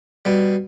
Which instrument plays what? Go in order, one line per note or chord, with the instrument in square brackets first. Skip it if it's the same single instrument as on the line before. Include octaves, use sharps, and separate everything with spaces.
[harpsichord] B2 G3